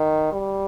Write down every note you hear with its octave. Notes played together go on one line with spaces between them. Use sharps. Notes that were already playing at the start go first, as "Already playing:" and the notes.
Already playing: D#3
G3